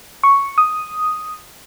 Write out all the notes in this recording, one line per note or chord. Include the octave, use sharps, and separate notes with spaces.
C#6
D#6